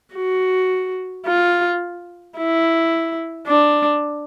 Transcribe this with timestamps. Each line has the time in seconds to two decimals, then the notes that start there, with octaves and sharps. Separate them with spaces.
0.15 F#4
1.26 F4
2.38 E4
3.47 D4